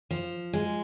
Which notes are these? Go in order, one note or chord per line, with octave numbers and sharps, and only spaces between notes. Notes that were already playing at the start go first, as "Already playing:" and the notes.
F3
G#3